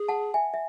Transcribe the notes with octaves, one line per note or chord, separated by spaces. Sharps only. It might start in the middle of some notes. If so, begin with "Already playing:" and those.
Already playing: G#4
F#5 A5
E5 G#5
E5